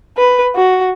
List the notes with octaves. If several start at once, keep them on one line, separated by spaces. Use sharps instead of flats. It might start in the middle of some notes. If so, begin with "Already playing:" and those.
B4
F#4